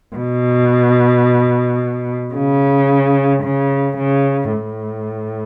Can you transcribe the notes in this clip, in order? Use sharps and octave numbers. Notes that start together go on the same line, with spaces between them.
B2
C#3
C#3
C#3
A2